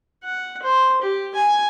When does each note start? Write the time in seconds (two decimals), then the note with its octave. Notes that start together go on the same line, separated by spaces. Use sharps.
0.24 F#5
0.63 C5
1.02 G4
1.35 G#5